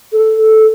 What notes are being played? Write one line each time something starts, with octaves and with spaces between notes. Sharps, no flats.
A4